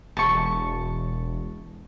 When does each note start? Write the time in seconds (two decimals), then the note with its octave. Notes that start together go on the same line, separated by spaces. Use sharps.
0.17 E1 A5 C#6